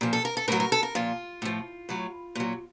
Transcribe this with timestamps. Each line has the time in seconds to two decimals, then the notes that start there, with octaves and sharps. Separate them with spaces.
0.01 A#2 F3
0.13 A4
0.25 A#4
0.37 A4
0.48 A2 A#4
0.52 F#3
0.60 A#4
0.72 A4
0.83 A#4
0.95 A#2 F3 F4
1.42 A2 F3
1.89 A2 F#3
2.35 A#2 F#3